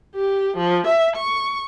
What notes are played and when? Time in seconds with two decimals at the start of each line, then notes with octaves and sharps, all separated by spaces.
0.15 G4
0.57 F3
0.87 E5
1.16 C#6